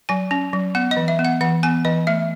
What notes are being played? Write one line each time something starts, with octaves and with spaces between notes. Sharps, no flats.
F#3 G#5
C#4
F#3
B3 F#5
D#5
E3
E5
B3
F#5
E3 F#5
B3 G#5
E3 D#5
A3 E5